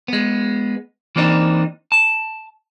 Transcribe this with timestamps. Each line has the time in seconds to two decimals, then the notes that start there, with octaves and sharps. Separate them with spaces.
0.08 G#3 B3
1.16 E3 A#3 C4 D4 D#4
1.92 A5